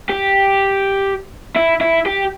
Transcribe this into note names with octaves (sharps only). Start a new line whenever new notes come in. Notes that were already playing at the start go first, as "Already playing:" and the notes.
G4
E4
E4
G4